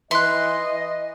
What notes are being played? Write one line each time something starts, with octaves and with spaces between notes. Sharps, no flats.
E3 D#5 E5 C6 F#6